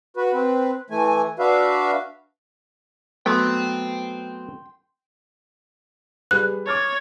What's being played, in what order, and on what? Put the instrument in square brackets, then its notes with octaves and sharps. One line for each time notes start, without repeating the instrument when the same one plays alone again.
[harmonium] F#4 B4
C4 B4
E3 A3 G#5
D4 F#4 B4 E5 F5
[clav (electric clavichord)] F#3 A3 B3 [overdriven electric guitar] G5 C6
[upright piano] G3 G#4 B4 [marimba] F#6
[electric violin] C#5 [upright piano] D6 F6 A6